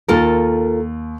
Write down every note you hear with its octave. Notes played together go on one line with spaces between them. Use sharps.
D#2 F4 A4 A#4